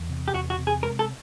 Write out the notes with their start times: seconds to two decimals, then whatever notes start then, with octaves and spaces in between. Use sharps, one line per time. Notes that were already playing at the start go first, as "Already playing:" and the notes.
Already playing: E2
0.09 C3
0.28 G4
0.34 E2 F#4
0.50 F#4
0.59 C3
0.67 G#4
0.82 G#3 A#4
0.99 A4